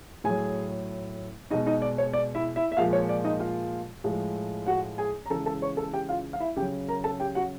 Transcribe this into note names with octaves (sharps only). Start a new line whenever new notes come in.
A2 F#3 G#4 G#5
B2 G#3 D#4 D#5
D#4 D#5
D5
C#5
D5
E4 E5
E4 E5
E5
A#2 F3 G#3 F4 F5
C#5
D5
D#4 D#5
F4 F5
A2 F3 G#3
F#4 F#5
G#4 G#5
A#5
C#3 E3 G#3 A4 A5
A4 A5
C#5 C#6
A4 A5
G4 G5
F4 F5
F5
E4 E5
C#3 F#3 G4 G5
A#4 A#5
A4 A5
G4 G5
F#4 F#5